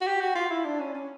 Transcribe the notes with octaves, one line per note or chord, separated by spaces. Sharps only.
F#4
G4
F#4
F4
E4
D4
C#4
C#4